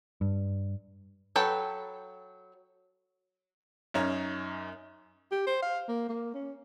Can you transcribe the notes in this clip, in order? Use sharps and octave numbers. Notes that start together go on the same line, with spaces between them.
G2
F#3 A4 B4 G5 B5
F#2 C#4 D#4
G4
C5
F5
A#3
A#3
C#4